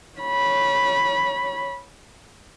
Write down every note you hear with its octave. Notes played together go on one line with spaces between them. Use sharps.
C#5 B5